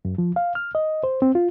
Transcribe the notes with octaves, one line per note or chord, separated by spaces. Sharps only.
F#2
F3
F5
F6
D#5
C5
C4
F4